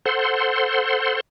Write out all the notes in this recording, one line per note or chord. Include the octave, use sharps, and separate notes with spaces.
A4 C5 F#5 C6